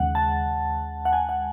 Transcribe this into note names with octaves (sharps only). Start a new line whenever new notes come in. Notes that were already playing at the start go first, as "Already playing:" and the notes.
Already playing: D#2 C#3 G#3 F#5
A5
F#5
G#5
F#5